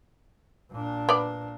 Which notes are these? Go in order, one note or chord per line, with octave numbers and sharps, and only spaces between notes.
A#2 D4
B3 D5